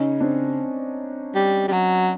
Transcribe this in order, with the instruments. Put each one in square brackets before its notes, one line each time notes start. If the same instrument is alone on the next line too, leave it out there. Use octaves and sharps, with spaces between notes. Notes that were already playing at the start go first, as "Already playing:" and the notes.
Already playing: [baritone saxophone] C#3 [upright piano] C#4 D#4
[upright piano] C4 D4
[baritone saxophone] G3
G3
F#3